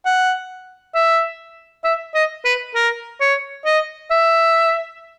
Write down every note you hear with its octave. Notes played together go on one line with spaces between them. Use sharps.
F#5
E5
E5
D#5
B4
A#4
C#5
D#5
E5